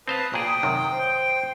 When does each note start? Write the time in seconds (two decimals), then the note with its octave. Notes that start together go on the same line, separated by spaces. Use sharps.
0.08 C4 B4 C5 F5 A5 D#6
0.34 A#2 G#4 G5
0.63 F#2 C3 D#3
0.92 C5